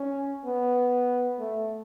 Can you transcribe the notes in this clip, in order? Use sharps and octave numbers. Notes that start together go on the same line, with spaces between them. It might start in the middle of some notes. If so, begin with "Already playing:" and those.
Already playing: C#4
B3
A3